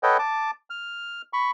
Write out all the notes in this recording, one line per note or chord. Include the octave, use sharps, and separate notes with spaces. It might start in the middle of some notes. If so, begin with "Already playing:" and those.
A4 B4 C#5 D#5 F#5 G5
A5 D6
F6
B5 C#6